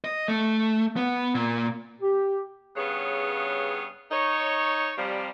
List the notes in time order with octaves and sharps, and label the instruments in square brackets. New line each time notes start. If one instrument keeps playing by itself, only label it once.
[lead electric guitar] D#5
A3
B3
A#2
[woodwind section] G4
[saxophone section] G2 C#3 B3 G#4 C#5
D#4 C#5
C3 F3 G3